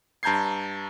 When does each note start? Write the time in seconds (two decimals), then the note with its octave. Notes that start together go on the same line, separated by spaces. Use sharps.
0.23 G2 A5 A#5 G6 G#6 C7